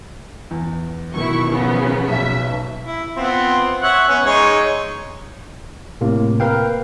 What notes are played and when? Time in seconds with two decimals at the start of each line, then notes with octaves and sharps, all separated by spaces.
0.51 E2
1.14 B2 D#3 F#3 E4 C#6
1.49 C#3 F3 B3
2.08 B1 B2 E5
2.85 E4
3.17 B3 C4 F4
3.83 C#5 E5 F#5
4.08 B3 C#4
4.25 G#3 D#4 C#5
6.01 A2 C3 A#3
6.40 A#4 B4 F5 G5